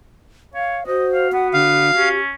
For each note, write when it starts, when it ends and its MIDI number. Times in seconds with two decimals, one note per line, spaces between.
0.54 0.79 73
0.54 0.84 77
0.87 2.13 66
0.87 1.28 72
0.87 1.06 75
1.14 1.29 77
1.33 1.90 59
1.33 1.48 78
1.54 1.92 50
1.54 2.09 77
1.95 2.33 61
1.95 2.20 67